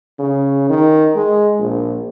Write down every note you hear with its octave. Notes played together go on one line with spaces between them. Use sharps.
C#3
D#3
G#3
A#1